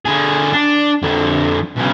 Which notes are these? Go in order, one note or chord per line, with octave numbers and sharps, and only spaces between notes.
D3 G#4
D4
F2 D3
B1 C#3